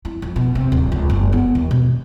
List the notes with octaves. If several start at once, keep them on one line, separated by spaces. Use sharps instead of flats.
E4
F2
B2
C3
D1
C#2
F#1
B3
D#2
B2